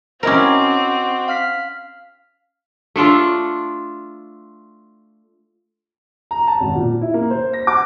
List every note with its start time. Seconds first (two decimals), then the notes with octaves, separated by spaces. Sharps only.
0.23 C4 C#4 E4 F#4 A#4 C5 D#5 D6
1.28 F5 F6 B6
2.96 A3 D4 F4 A4
6.31 A#5
6.47 A5
6.60 G#1
6.75 A#2
7.01 E4
7.14 A#3
7.30 C5
7.53 A#6
7.67 D6